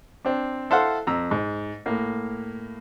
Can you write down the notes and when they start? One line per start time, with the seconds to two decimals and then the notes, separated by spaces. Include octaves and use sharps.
0.25 C4 D4
0.70 E4 A4 C5 F5 F#5
1.07 F2 A#5 E6
1.31 G#2
1.86 A2 A#3